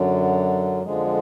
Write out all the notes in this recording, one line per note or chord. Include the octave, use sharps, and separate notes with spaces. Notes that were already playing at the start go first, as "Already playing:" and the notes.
Already playing: F#2 D3 F#3
F2 D3 F3 G#3